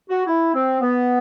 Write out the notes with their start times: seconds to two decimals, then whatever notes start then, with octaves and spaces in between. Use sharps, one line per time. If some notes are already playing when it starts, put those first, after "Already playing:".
0.08 F#4
0.26 E4
0.53 C4
0.80 B3